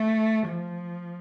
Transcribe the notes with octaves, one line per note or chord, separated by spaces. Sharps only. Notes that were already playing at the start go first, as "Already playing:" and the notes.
Already playing: A3
F3